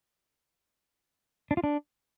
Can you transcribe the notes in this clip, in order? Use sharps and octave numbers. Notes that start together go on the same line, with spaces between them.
D4
F4
D4